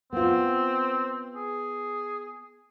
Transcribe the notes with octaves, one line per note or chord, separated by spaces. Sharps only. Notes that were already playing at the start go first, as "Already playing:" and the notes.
B3 C4 F4
G#4